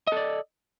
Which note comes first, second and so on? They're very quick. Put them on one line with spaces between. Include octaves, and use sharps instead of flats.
D#5 A4 D5